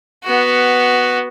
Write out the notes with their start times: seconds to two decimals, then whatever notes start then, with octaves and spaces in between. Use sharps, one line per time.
0.24 B3 F#4